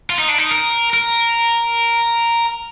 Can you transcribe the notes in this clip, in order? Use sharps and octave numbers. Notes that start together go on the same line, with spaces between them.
F4
D#4
D4
D#4
A#4
A#4